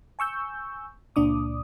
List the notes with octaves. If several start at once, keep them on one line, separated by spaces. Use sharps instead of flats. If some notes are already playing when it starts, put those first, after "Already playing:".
G#5 C#6 E6 G6
C#2 A#2 D4 D6 D#6